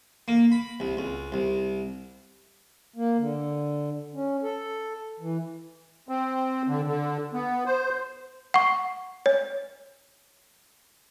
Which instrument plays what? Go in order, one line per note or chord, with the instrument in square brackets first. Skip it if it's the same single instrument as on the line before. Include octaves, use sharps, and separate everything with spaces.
[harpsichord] A#3
B5
C2
C#2
C2
[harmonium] A#3
D3
C#4
A4
E3
[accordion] C4
D3
D3
B3
C5
[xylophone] F#5 C#6
C#5